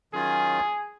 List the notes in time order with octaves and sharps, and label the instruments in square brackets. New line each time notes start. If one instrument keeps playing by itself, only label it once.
[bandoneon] D#3 F#3 C#4 F4 [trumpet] G#4